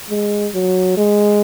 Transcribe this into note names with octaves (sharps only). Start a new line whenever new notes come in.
G#3
F#3
G#3